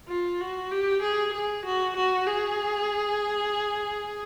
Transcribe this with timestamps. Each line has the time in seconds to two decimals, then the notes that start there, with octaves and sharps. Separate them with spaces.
0.08 F4
0.40 F#4
0.71 G4
1.01 G#4
1.33 G#4
1.65 F#4
1.96 F#4
2.27 G#4